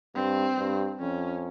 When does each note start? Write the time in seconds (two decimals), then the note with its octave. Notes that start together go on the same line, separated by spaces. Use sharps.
0.15 G2 C4
0.58 G2
1.00 F2 C#4